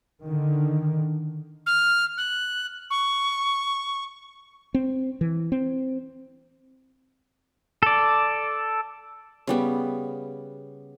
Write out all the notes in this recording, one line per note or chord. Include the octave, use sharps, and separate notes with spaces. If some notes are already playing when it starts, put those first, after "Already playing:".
D3 D#3
F6
F#6
C#6
C4
E3
C4
A4 D5
C#3 G3 B3